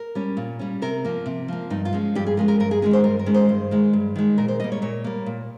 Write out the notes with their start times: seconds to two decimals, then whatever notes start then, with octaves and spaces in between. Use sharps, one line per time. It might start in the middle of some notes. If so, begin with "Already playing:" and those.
Already playing: A#4
0.15 G3 C#4
0.37 A#2
0.59 G3 C#4
0.82 C3 A#4
1.05 F3 A#3
1.26 C3
1.48 F3 A#3
1.70 G2 D#4
1.85 F4
1.93 F3 G#3 C#4
2.15 G2 G4
2.26 G#4
2.37 F3 G#3 C#4 A#4
2.48 A#4
2.60 G2 A#4
2.71 G#4
2.82 D#3 G#3 C#4 G#4
2.93 C5
3.04 G2 A#4
3.19 A#4
3.26 D#3 G#3 C#4
3.34 C5
3.49 G2
3.71 D#3 G#3
3.93 G2
4.16 D#3 G#3
4.38 A#2 A#4
4.48 C5
4.60 G3 A#3 D#5
4.72 C#5
4.82 A#2 C#5
5.04 G3 A#3
5.26 A#2